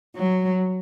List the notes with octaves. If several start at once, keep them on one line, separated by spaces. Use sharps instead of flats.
F#3